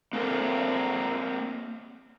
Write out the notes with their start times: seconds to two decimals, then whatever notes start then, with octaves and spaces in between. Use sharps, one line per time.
0.13 A#3 C4 D4 A4 A#4